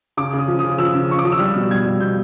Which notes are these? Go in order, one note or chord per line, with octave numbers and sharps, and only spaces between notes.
C#3 D6
C#3
D#6
F3
D#6
C#3
F3 E6
C#3
F3 C#6
D6
F3 D#6
E6
G3 F6
B2
G3 G#6
G3
B2 G6